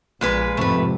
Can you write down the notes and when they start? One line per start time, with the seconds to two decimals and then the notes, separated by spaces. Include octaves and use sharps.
0.21 A#1 A#2 G#3 B4
0.57 F2 G#2 C3 A3 B4